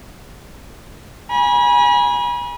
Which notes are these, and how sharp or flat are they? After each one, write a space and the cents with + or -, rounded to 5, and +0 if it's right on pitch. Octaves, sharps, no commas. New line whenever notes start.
G#5 -10 B5 -40